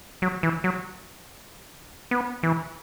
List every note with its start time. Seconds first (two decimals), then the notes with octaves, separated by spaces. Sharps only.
0.22 F#3
0.43 E3
0.64 F#3
2.11 B3
2.43 E3